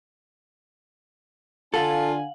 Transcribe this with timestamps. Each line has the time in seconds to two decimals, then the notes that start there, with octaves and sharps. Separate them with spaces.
1.74 D3 D4 F4 A4 F5 F#5 G#5 F#7